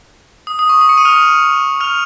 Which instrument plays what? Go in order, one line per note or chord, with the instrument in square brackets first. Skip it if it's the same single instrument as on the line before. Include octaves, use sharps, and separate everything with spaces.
[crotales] D#6
D#6
C#6
D#6
C#6 C#7
D#6 D#7
F6 F7
F6 F7